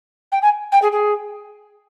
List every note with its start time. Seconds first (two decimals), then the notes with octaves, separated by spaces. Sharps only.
0.32 G5
0.42 G#5
0.72 G5
0.82 G#4
0.92 G#4